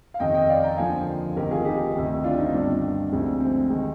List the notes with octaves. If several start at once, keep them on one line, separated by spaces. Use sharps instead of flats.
F5
F2 C3 D#3 D#5 G5
D#5 G5
D5 F5
G5 A#5
D#2 D3 F3 A#3 F5 G#5
F1 F2 D#3 G4 A#4
F4 G#4
D#4 G4
D2 C3 D#3
D4 F4
C4 D#4
G1 G2 D#3 D4
D2 C3 F3 G#3 C4
C4
C3 D#3 G#3